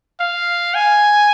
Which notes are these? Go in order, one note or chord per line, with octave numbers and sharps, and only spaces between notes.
F5
G#5